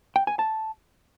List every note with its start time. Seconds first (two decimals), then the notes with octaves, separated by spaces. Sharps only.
0.16 G5
0.27 G#5
0.39 A5